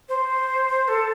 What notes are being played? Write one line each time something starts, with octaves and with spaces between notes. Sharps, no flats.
C5
A4